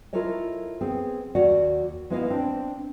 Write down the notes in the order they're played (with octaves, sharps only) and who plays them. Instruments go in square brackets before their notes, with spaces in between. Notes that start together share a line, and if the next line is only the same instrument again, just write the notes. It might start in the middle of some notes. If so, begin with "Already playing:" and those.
[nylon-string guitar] E4 F4 A4 A#4 C#5 D#5
B3 C4 G#4
D#2 F#4 C#5 D5 F#5
G#3 B3 E4 B4 D#5 F5
C4 D4